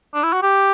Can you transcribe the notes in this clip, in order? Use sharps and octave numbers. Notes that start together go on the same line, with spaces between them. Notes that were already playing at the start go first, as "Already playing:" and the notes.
D4
E4
F#4
G4